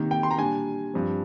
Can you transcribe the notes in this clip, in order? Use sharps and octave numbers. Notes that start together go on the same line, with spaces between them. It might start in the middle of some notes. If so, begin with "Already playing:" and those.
Already playing: C3 D#3 A#3 D#4
G5
C6
A#5
A#2 G3 D4 G#5
G2 F3 C4